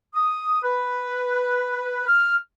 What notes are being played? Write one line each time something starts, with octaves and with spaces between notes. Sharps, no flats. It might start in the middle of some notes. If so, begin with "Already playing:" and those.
D#6
B4
F6